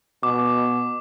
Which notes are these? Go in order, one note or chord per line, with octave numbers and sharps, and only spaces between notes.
B2 D6